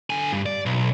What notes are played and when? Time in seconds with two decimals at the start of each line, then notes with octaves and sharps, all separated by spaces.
0.10 D3 G#5
0.33 G2
0.46 D5
0.66 B1